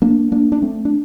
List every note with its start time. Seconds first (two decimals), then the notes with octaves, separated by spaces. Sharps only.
0.02 A#3 D4
0.32 A#3 D4
0.52 D4
0.62 A3 C4
0.85 D4